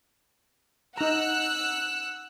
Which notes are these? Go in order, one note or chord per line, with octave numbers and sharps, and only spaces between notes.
D#4 F#5 A#5 E6 F#6